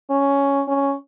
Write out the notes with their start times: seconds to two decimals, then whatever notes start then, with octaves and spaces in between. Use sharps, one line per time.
0.10 C#4
0.68 C#4